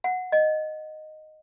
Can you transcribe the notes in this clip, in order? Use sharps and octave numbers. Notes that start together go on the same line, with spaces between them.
F#5
D#5